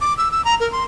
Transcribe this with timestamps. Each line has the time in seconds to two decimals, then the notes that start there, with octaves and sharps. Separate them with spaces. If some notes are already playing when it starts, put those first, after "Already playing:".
0.01 D6
0.17 E6
0.32 E6
0.45 A#5
0.60 A#4
0.72 C6